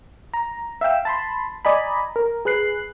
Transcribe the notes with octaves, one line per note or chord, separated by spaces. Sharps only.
A#5
E5 F5 G5 E6
A5 B5 C6
D5 D#5 G#5 A#5 B5
A#4
G#4 B4 F#6 C7